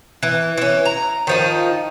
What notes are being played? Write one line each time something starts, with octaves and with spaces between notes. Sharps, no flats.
E3
E3 C#4
A#5
D#3 F3 D#4